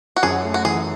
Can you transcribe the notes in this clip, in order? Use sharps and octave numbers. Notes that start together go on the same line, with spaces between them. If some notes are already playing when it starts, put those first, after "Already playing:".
F#4
F#2 G#4
A3
F#4
E3 G#4